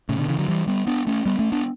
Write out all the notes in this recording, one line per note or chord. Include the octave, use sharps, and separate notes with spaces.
A2 C#3
B2 D3
C#3 E3
D3 F#3
E3 G3
G3 B3
B3 D4
A3 C#4
G3 B3
A3 C#4
B3 D4